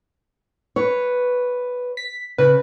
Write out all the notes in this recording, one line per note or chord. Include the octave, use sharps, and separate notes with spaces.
B4 C#5
B6
C#3 B4